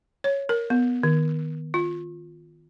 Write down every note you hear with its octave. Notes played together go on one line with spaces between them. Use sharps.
C#5
A#4
B3
D#3
F4